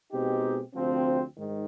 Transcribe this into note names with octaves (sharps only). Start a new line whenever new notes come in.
B2 G#3 C4 D#4 G4
D2 C3 F3 C4
G#2 D#3